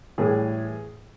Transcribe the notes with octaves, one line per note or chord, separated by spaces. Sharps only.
A2 E3 G3 G#4